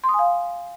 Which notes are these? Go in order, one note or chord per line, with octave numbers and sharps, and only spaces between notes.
C6
D#6
G#5
F5